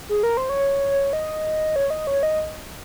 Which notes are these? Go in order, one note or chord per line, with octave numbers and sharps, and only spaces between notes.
G#4
A#4
C5
C#5
D#5
C#5
D#5
C#5
D#5